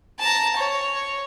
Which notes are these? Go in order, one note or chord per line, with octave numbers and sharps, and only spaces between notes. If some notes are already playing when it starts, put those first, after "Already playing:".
A5 A#5
C#5